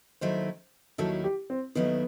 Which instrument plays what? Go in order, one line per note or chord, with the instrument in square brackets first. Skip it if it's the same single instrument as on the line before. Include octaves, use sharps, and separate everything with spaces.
[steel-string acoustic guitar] D#2 D#3 F#3 A3 E4 [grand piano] C5
[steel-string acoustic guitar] D#2 D#3 F#3 A3 E4 [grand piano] A4
[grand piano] G4
C4
[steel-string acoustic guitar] D#2 D#3 F#3 A3 E4 [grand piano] B3